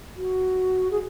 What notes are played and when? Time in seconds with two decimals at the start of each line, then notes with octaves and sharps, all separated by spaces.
0.16 F#4
0.91 G#4